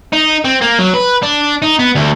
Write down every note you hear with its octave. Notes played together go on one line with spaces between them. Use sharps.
D#4
C4
A#3
F#3
B4
D4
D#4
B3
D2